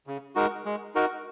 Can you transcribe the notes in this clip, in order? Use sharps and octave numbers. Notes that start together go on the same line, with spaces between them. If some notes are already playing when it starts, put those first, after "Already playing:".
C#3
G#3 D#4 F#4 A#4
G#3
D#4 F#4 A#4